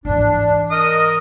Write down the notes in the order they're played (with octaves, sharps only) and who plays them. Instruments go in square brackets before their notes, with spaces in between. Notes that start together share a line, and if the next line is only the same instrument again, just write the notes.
[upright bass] G#2 E3 [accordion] D4
[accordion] A#4 D#5 [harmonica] D#6